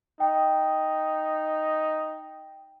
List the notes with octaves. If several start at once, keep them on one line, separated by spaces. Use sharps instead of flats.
D#4 G5